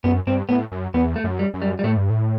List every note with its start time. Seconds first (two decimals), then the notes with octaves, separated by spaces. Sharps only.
0.04 F#2 B3
0.27 G2 C4
0.49 A2 B3
0.72 F#2
0.94 E2 B3
1.16 A3
1.24 F#2
1.39 G3
1.54 F#2
1.62 G3
1.79 G3
1.84 A2 A3
1.97 G2
2.10 A2